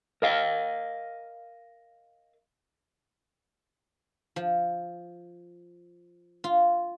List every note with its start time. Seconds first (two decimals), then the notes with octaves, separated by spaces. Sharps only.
0.22 A#4 D#5 F5
4.36 F3
6.44 F4